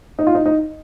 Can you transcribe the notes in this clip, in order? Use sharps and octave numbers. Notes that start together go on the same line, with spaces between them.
D#4
F4
D#4
D#4